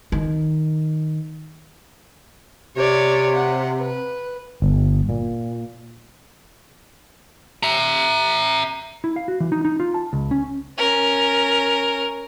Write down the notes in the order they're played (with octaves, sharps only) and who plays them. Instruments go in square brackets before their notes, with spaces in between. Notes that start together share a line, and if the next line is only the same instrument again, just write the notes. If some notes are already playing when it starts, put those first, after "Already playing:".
[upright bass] D#3
[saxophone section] C3 [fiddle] C#5 D5
[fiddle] F#5
B4
[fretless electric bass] G1
A#2
[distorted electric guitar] E5 A#5
[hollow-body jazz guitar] E4
F5
F#4
E3
D#4
D#4
F4
A5
C#2
C#4
[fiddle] C#4 A#4